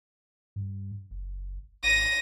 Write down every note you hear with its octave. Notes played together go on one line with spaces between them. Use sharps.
G2
F#1
G#1 A#6 D#7